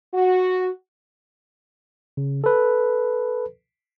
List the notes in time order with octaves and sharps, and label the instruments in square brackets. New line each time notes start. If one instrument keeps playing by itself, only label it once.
[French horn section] F#4
[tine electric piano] C#3
A4 B4